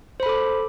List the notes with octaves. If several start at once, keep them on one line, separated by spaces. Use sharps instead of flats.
A4 C5 B5 D6